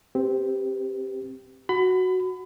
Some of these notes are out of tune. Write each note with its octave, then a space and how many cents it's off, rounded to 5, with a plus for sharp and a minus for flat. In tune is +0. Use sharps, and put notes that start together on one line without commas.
C4 +0 G4 +0 B4 +25
F#4 +0 B5 +30